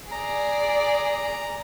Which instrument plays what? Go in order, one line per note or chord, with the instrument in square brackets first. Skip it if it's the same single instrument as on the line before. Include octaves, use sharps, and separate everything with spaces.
[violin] G#4 D5 [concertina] A#5